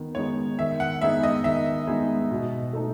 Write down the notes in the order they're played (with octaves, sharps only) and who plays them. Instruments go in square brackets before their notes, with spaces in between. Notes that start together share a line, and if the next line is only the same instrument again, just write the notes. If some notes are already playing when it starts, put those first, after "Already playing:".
Already playing: [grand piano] D#3 B3
[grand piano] G#3 B3 D#4 G#4 [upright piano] C#5
[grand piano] D#3 [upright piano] E5
[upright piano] F#5
[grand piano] G#3 B3 D#4 G#4 [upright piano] E5
[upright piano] D#5
[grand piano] D#3 [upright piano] E5
[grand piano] G#3 B3 D#4 G#4
B2
A3 D#4 A4